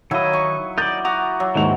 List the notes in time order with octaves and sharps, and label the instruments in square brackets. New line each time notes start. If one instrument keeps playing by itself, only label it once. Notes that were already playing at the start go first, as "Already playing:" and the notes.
[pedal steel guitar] D#3 D#5 [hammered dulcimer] F#3 E4 [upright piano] C#5 F5 B5
[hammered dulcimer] C#6
[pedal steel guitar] D#4 D5 [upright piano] G6 A6
[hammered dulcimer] F#4 [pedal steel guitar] A#5 D6 D#6
[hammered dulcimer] F#3
[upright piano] D#2 G#2 F7 [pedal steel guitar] E3 F#4